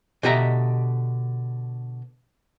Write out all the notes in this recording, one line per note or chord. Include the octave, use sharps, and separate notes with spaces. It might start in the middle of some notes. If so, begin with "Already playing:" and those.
B2 D3 G4 D#5 E5 A#5